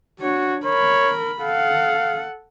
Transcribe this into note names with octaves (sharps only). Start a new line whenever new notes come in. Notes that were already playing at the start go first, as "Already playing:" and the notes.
D4 F#4 C#5
A#4 C#5 B5
A4 F5 F#5